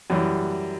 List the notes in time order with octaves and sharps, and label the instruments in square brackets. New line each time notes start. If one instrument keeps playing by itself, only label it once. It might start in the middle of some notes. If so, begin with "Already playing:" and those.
[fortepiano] F#2 E3 G3